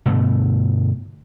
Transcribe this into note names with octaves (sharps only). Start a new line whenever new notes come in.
G2 B2 D3 A3